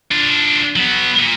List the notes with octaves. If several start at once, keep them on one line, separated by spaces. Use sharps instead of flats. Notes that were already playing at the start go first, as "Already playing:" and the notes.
D4 F4
F#3 B3
A#2